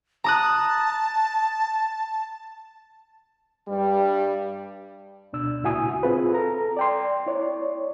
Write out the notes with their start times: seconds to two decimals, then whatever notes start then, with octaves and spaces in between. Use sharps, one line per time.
0.24 A5 A#5 D#6 F#6
3.68 G2 G3
5.33 D2 B2 D4 E6
5.64 C#2 A#2 E4 F#4 G#5 D#6
6.03 C4 F4 G#4 B4
6.32 A4 A#5
6.77 D5 G5 C6
7.26 E4 C#5 D5